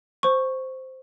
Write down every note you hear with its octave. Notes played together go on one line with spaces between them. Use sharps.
C5 C#6